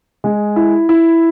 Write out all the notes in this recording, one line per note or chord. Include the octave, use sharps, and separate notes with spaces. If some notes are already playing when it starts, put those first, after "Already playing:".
G#3
E4
E4